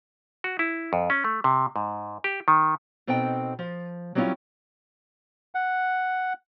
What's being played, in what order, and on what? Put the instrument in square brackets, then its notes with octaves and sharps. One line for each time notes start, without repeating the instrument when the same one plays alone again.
[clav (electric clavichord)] F#4
E4
F2
C#4
A3
C3
G#2
G4
D#3
[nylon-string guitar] B2 C4 D#4 A4 G5
F3
F#3 G3 C4 C#4 E4 F4
[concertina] F#5